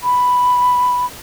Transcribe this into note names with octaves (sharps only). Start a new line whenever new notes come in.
B5